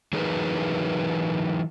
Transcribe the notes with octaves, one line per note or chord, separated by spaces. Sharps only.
E3 F#3 D#4 G#4 A#4 B4